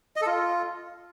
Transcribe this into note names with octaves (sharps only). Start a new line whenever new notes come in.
D#5
A4
F4